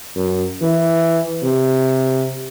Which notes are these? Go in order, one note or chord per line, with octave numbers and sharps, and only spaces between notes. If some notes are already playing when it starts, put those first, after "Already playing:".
F#2
E3
C3